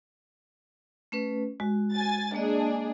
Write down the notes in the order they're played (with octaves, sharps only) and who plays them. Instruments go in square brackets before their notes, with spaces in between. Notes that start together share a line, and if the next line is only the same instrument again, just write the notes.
[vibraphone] A3 C#4 B4
[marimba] G#3 [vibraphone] F#4
[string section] G#5 A6
[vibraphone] A#3 D#5 [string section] D4 G#4